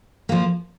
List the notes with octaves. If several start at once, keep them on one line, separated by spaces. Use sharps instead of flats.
F3 A#3